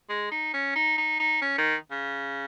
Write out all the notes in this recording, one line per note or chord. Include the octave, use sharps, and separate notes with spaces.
G#3
D#4
C#4
D#4
D#4
D#4
C#4
D#3
C#3